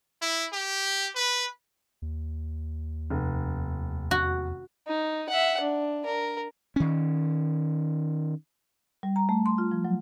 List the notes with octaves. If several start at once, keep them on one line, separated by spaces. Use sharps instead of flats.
E4
G4
B4
D#2
F1
E2 F#4
D#4
E5 F#5
D4
A#4
D#3 C#4
G3
A#5
A3
C6
F4
F3
F#3